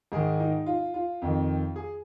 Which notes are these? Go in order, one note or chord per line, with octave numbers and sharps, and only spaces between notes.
G#2 D#3 G#4
D#4
F4
F4
F2 D#3
G#4